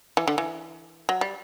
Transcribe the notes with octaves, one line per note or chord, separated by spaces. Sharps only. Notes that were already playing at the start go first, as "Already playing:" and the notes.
E3
D3
E3
F#3
G3